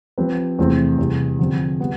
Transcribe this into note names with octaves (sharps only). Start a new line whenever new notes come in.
F3 C4 G4 B4
E2 C3 E3 A3 C4
E2 C3 G3
D3 F3 C4
G3 B3